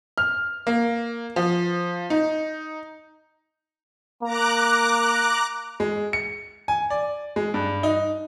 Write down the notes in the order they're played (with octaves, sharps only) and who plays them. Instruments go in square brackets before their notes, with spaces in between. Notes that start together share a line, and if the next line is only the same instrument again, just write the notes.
[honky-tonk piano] F6
A#3
F3
D#4
[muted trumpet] A#3 [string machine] A#5 D6 F#6
[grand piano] G#3
C#7
G#5
D5
G#3
G2
D#4